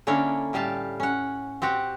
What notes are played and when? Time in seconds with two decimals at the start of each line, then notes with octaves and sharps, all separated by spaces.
0.07 D3 A#3 C#4 D4 E4 C#5
0.53 A2 G3 G4 F5 A5
1.00 C#4 F#5
1.62 C4 F#4 G4 F#5